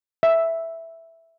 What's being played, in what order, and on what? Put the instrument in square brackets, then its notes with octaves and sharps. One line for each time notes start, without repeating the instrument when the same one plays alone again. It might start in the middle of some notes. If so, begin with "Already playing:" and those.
[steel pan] E5